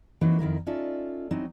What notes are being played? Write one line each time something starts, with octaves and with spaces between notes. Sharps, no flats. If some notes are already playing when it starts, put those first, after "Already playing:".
E3 F#3 A#3 C4 D#4 F#4
F2 D#3 E4 A#4
C#4 D#4 F4 A4 D5 E5
F#3 C4 C#4 D#4 E4